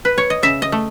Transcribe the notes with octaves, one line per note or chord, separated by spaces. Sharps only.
B4
C#5
D#5
C#3 E5
D#5
A3